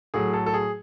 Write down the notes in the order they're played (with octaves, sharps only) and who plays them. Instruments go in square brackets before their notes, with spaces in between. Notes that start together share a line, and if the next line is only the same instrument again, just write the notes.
[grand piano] A2 F#3 G#4
A4
A4
G#4